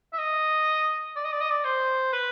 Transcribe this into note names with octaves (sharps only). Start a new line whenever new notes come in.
E5
D#5
D5
D#5
D5
D#5
D5
C5
B4